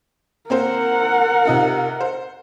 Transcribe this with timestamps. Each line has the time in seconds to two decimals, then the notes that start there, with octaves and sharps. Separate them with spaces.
0.50 A#3 C4 A#4 C5 F#5
1.45 C3 D#4 F4
2.01 C5